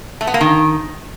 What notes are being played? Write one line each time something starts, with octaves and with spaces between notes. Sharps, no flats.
A3
B3
A#3
D#3